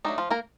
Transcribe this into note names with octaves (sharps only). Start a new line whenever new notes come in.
F#3 A3 D4 D#4
F3 F4
A#3 A#4